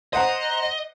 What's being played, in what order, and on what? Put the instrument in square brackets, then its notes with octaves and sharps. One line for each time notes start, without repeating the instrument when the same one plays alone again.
[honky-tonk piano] C5 F#5 A#5 [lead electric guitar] D#5